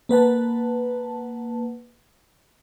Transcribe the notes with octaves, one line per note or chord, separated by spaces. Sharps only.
A#3 B4 F#5 A5